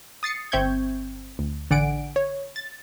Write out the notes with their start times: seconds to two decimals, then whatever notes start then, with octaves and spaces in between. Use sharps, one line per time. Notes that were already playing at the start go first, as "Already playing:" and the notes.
0.23 D#6 A6 C7 C#7
0.52 G1 C4 E5 C#6 G6 G#6
1.39 D2
1.70 A1 D3 D5 F#5 G#5 D7
2.16 C#5
2.56 A6